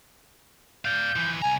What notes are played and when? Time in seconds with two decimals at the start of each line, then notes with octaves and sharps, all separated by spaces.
0.85 D5 F5 G6
1.16 E3 F3
1.42 C2 G#5 A#5